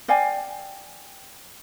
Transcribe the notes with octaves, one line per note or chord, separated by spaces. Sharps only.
D5 F5 G5 G#5